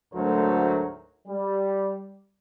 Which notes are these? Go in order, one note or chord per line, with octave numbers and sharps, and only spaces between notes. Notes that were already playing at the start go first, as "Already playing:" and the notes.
D2 G#2 F#3 A3 A#4 C5
G3